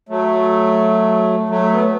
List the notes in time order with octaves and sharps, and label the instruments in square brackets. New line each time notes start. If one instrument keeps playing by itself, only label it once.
[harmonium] F#3 A3
F#3 A3
B3